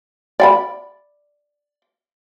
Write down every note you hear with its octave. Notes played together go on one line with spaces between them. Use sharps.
D5 G5 B5